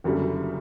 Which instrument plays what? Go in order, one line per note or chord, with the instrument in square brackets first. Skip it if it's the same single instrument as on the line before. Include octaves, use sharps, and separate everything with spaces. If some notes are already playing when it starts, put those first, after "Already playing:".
[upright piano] F#1 F#2 D3 G3